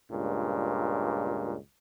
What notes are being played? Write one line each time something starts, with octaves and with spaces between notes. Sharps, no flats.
C#2 G2 A#2